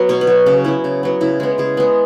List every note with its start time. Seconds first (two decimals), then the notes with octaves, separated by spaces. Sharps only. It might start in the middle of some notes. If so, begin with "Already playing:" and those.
Already playing: F#3 B3 F#4
0.09 B2 C#5
0.21 B4
0.27 F#3 B3
0.46 C#3 C#4
0.64 F#3 B3 E4
0.84 C#3
1.03 F#3 B3
1.21 C#3 E4
1.40 G#3 B3
1.58 C#3 G#4
1.77 G#3 B3